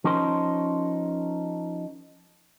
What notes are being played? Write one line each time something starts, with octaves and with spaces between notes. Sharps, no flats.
F3 C#4 D#4 A#4 C5